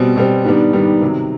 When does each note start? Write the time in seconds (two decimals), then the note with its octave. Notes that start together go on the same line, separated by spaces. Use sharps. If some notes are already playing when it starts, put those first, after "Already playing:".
Already playing: B2 G3 C4
0.16 B2 G3 C4
0.45 G#2 D#3 G3 B3 D4
0.73 G#2 D#3 G3 B3 D4
1.01 C3 D#3 F#3